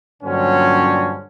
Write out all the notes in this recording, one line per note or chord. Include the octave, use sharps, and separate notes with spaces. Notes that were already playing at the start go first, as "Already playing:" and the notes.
G2 A#2 D3 F#3 C4 C#4